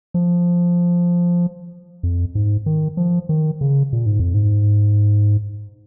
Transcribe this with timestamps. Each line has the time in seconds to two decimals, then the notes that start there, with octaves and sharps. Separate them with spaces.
0.14 F3
2.03 F2
2.35 G#2
2.66 D#3
2.97 F3
3.29 D#3
3.61 C#3
3.93 A#2
4.06 G#2
4.19 F2
4.34 G#2